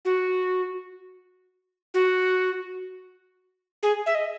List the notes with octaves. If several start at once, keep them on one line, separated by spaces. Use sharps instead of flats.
F#4
F#4
G#4
E5
D#5